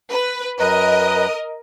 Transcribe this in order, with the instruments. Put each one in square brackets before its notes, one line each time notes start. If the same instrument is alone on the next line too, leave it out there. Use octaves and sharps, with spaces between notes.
[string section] B4
[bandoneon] F#2 B4 A#5 [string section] A#4 D#5